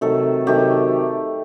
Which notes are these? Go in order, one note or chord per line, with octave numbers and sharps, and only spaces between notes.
C3 D#3 F#3 A3 A4
C3 D#3 F#3 A3 G4